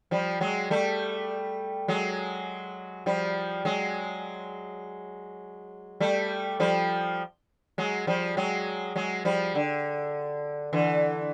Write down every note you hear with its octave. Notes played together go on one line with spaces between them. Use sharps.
F3 G3
F#3 G#3
G3 A3
F#3 G#3
F3 G3
F#3 G#3
G3 A3
F3 G3
F#3 G#3
F3 G3
F#3 G#3
F#3 G#3
F3 G3
D3
D3 E3